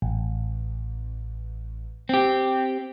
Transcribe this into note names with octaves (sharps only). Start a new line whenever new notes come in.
A1
C4 G4